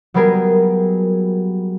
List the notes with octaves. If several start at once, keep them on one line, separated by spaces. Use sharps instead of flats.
F#3 G3 B3 G#4 A#4